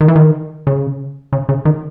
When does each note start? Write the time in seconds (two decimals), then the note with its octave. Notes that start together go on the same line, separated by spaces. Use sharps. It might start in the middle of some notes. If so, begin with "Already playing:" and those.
0.01 D#3
0.08 E3
0.16 D#3
0.67 C#3
1.33 C#3
1.49 C#3
1.65 D#3